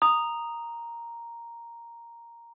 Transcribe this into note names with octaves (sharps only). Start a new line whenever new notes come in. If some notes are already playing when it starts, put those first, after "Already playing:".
A#5 D#6